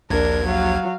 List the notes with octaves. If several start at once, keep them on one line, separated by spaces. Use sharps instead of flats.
A#1 D#2 D4 A#4 G#6
F#3 F5